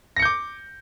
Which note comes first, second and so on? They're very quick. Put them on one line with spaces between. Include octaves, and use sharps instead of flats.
A#6 C#7 G6 D6